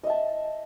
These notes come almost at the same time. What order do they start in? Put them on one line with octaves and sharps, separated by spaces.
D#5 E5 A5